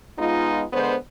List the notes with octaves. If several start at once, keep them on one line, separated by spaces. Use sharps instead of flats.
G#3 B3 D#4 F4
D3 G#3 B3 C5